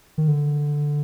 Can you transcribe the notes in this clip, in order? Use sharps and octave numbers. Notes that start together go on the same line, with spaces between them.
D#3
D3